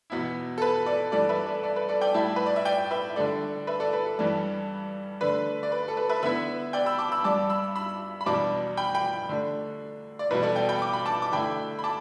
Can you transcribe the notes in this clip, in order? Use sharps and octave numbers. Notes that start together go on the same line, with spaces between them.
E2 B2 B3 E4
A4
B4
A4 D5
G2 E3 G3 A4 D5
B4 E5
A4 D5
A4 D5
B4
A4 D5
D5 G5
A2 G3 E4 E5 A5
B4
D5
E5
D5 G5
B4 E5
D3 G3 D4 A4 D5
B4 E5
A4 D5
B4
A4
G2 E3 G3
D3 A3 D4 B4
D5
B4
A4
B4
B4 E5
D3 B3 E4 B4 E5
D5 G5
B5 E6
A5 D6
B5 E6
G2 G3 D4 A5 D6
B5 E6
B5 E6
B5
E2 B2 G3 D4 A5 D6
G5 B5
G5 B5
D3 A3 D4
D5
E2 B2 G3 B4
A4 D5
D5 G5
G5 B5
D6
B5
A5 D6
D6
D3 A3 E4 G5 B5
B5
A5 D6